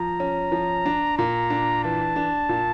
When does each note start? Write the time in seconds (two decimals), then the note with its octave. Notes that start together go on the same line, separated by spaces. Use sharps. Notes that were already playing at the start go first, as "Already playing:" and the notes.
Already playing: F3 A#5
0.20 C#4
0.52 F3
0.86 D4
1.18 A#2 A#5
1.50 D4
1.84 E3 A5
2.16 D4
2.49 A#2